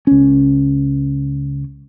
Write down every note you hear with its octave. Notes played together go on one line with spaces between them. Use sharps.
C#2 C#4